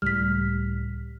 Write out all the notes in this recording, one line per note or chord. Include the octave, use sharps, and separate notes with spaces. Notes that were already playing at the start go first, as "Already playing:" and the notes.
C#2 A2 G3 F6 B6